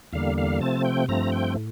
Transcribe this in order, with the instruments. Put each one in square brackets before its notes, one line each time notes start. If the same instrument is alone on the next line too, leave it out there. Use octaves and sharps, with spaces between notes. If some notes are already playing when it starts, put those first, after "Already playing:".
[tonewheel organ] E2 D3 G3 A#3 F5
F5
C3 F3 A3 C4 A5
G5
G2 F3 A3 C4 A#5
G5
A2